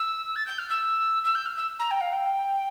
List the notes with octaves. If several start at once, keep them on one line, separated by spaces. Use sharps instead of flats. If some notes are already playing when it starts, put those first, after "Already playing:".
Already playing: E6
A6
G6
F6
E6
E6
G6
F6
E6
A#5
G5
F5
G5